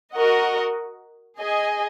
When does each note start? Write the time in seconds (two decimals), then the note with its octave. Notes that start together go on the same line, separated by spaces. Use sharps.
0.15 F#4 A#4 D#5 F#5
1.39 G#4 D#5 G#5